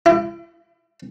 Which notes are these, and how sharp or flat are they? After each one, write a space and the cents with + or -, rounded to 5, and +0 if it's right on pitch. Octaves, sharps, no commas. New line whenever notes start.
E4 +40